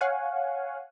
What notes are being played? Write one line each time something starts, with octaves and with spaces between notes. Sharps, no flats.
C#5 F5 F#5 G#5